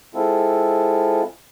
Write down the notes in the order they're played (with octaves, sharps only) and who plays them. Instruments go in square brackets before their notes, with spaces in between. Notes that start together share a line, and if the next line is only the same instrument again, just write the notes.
[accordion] G#3 C4 E4 F4 A4